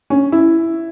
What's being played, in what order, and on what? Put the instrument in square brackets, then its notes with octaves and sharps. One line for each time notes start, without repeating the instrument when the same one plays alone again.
[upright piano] C#4
E4